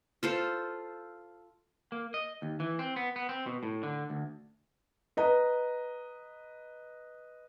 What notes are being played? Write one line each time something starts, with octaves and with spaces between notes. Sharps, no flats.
F4 A4 C5
A#3
D#5
D#2
E3
C4
B3
B3
C4
B2
A2
D3
D2
B4 D#5 A#5